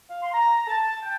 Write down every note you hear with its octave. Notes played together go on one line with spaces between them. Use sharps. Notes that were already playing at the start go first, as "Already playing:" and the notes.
F5
C6
A#5
A5
G5